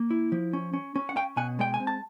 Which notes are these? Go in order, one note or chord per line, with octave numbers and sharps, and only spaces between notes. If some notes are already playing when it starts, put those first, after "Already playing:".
Already playing: A#3
E4
F3
C#4
C#4
C#4
F#5
C#4 F5 G5
B2 F#5 G#5
G#3 G5
G#5
C4
A5